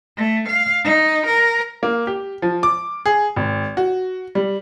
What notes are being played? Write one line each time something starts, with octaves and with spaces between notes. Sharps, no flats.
A3
F5
D#4
A#4
A#3
G4
F3
D6
G#4
G#1
F#4
G3